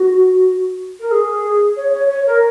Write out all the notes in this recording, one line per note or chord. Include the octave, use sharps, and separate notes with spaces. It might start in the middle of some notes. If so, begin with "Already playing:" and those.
Already playing: F#4
A#4
G#4
C#5
C#5
C#5
A#4